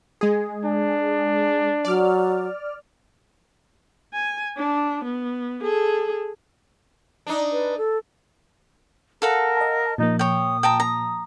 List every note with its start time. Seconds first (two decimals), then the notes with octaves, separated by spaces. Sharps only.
0.21 G#3 G#4
0.64 D4
1.85 F#3 D5 F6
4.14 G#5
4.57 D4
5.05 B3
5.63 G#4 A4
7.27 D4 D#4
7.52 B4
7.78 A4
9.22 A4 A#4 F5 F#5
9.57 D#5 A5
9.98 A#2 F3 A#3 D#4
10.19 C#5 G5 D#6
10.63 G5 A5 A#5
10.80 A#5